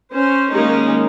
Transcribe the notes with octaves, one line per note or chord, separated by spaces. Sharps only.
C#4 C5
D#3 G#3 A#3 C#4 D#4